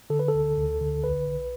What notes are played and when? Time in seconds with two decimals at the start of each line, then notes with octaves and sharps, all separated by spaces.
0.10 D3 A4
0.19 B4
0.28 A4
0.34 D2
0.57 D2
0.80 D3
1.04 B1 B4
1.26 B1